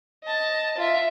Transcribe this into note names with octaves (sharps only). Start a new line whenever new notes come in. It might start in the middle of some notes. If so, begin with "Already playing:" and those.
D#5 A5
F4 E5